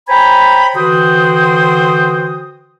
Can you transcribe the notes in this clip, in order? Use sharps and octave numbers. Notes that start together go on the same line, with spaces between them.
C5 C#5 G5 G#5 A#5 B5
D3 E3 F#4 C5 G5 D#6